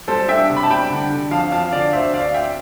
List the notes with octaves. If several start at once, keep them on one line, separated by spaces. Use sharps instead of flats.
G3 A4 C5
D4 E5 G5
C3
B5
A5
G3 G5 B5
D3
D3
F2 F5 A5
F2 F5 A5
D3 D5 F5
D2 C5 E5
D2 D5 F5
C4 E5 G5